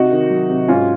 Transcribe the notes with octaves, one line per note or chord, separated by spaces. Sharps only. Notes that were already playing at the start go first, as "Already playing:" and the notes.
Already playing: C3 D#4 F#4
D#3
F#3
C3
G#2 C#4 F4